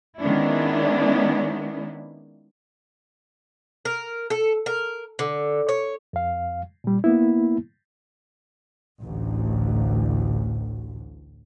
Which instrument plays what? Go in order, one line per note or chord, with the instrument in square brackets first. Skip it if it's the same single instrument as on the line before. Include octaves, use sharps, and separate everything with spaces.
[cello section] D#3 G#3 B3 C#4 D4 E4
[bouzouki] A#4
A4
A#4
D3
C#5
[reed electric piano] F2 F5
A#2 G3
A#3 B3 E4
[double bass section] A1 D2